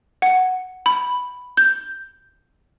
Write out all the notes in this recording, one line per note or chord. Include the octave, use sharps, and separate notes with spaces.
F#5
B5
G6